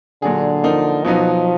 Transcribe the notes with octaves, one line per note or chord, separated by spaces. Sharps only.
A#2 D3 F#3 D4 G#4
F3 A#3 D#4
B2 F3 F#3 B3 D#4